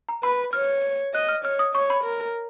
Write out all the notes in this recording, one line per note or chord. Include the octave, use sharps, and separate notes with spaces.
A#5
B4 B5
C#5 F6
D#5 F#6
F6
C#5 F6
D#6
C#5 C#6
B5
A#4